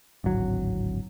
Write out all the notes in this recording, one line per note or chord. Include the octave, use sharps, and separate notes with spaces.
D1 G#1 F#3